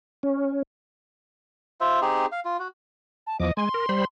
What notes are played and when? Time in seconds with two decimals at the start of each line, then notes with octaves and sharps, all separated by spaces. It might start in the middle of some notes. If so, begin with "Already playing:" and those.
0.23 C#4
1.81 F4 C5 E5
2.02 C4 D#4 G4 G#4
2.32 F5
2.45 F4
2.59 F#4
3.27 A5
3.40 E2 F3 D#5 D6
3.57 G#3 G#5 C6
3.74 A#4
3.89 G3 C5 B5